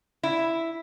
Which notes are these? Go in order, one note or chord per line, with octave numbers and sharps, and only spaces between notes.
E4